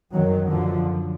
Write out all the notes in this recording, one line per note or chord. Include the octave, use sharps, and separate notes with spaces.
F#2 D#3 F#3
D3 F3